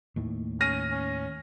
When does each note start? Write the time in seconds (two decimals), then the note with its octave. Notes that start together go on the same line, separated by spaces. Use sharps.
0.16 D#2 A2
0.61 C#4 F6 A#6 D#7
0.91 C#4